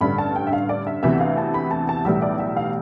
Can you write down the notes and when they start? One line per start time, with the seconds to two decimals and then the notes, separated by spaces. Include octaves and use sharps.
0.01 A1 G2 D3 B5
0.18 A5
0.36 G5
0.47 E5
0.53 F5
0.69 D5
0.87 E5
1.03 D2 C3 E3 B3 E5
1.20 F5
1.37 A5
1.54 B5
1.71 A5
1.89 A5
2.05 B1 A2 E3 G3 E5
2.22 D5
2.39 E5
2.57 F5